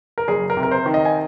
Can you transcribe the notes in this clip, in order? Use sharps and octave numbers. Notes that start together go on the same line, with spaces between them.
A#4
F#1 G#4
A#4
C3
A#4
C5
D#3
D#5
G#5